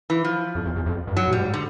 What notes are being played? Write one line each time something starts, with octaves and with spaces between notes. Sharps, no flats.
E3
F3
F2
E2
E2
F2
G2
F#2 F#3
A2
G#2 G3
D3